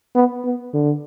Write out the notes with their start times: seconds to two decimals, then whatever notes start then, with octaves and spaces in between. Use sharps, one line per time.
0.15 B3
0.44 B3
0.73 D3